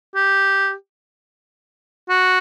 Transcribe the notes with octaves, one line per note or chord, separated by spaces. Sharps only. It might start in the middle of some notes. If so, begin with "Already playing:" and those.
G4
F#4